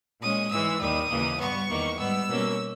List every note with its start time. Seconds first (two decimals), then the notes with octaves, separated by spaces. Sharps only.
0.20 A#2 G#3 C#4 D#6
0.50 G#2 E3 G#3 E6
0.79 D#2 D#3 G3 D#6
1.09 D#2 C#3 E3 A#3
1.38 G2 G3 B3 C#6
1.68 E2 D#3 A#3
1.98 G#2 G3 B3 E6
2.27 B2 G3 A#3 C#4